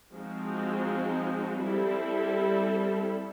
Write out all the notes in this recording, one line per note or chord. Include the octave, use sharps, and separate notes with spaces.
F3 G#3 C4 D#4 F#4
G3 C4 E4 A4